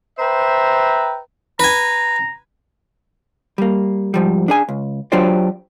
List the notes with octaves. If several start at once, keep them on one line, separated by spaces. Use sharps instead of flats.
B4 C5 E5 G5 A#5
B4 G#5 A#5
G3 A#3
G#2 F3 G3
D4 G#4 G#5
C#2
F#3 D4 F4 G4 C5 D5